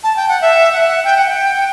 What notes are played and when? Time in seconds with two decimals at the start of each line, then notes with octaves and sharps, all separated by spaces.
0.04 A5
0.16 G5
0.28 F#5
0.41 E5
0.73 F#5
1.04 G5
1.17 F#5
1.29 G5